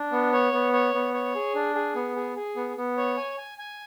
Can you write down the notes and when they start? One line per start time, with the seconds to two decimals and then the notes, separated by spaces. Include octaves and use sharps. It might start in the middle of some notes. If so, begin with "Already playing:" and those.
Already playing: D4
0.12 B3
0.33 C#5
0.52 B3
0.73 C#5
0.94 B3
1.14 C#5
1.35 G#4
1.55 D4
1.75 G#4
1.95 B3
2.16 G#4
2.36 G#4
2.56 B3
2.77 B3
2.97 C#5
3.17 G#5
3.38 G#5
3.58 G#5